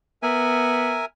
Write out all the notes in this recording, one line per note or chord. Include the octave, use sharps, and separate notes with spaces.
B3 A#4 E5 G#5